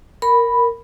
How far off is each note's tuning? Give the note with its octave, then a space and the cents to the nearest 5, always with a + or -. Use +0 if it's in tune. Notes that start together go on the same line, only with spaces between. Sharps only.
A#4 +0 B5 +0